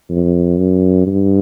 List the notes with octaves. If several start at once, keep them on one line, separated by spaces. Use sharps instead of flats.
F2
F#2
G2